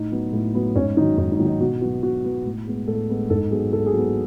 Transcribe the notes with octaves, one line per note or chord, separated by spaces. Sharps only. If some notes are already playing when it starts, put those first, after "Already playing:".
Already playing: A2 D#4
F#3 B3
A2
F#3 B3
G#2 C#4
D#3 F#3 D#4
G#2 D#4
D#4
D#3 F#3
D#4
B2 F#4
F#3 B3 F#4
B2 F#4
F#3 B3
A2
G#3 B3
A2 A4
G#3 B3
G#2 A4
F#3 B3 G#4
G#2 A4
G#4
F#3 B3